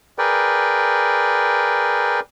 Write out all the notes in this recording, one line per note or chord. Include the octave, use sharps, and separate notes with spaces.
G#4 A#4 B4 D5 G5